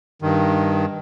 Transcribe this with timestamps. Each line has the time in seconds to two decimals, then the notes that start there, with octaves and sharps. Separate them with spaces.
0.22 G2 D#3